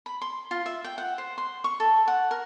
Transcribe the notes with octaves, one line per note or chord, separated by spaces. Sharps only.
B5
C6
F4
E5
G5
F#5
C5
C6
C#6
A4
F#5
A#4